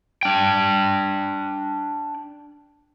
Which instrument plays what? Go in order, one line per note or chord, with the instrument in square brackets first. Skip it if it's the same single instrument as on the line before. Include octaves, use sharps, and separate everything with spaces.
[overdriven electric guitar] D4 G5